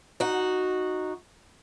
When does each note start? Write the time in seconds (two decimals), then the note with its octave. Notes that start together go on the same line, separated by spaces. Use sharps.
0.20 D#4 F#4